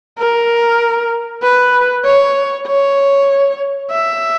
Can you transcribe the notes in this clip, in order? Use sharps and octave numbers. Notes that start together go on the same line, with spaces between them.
A#4
B4
C#5
C#5
E5